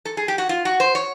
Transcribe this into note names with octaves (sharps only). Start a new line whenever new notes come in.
A4
G#4
G4
F#4
F4
F#4
C5
C#5